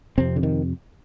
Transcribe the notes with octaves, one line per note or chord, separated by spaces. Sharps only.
F2 C3 C4
D3
D#3